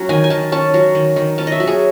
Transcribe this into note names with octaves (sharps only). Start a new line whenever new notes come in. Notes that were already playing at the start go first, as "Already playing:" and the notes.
Already playing: F#3 C#4
D#3 G#5
G#5
D#3 A5
C#4 A5
F#3
D#3
D#3
C#4 A5
D#5
E5
F#3
G#4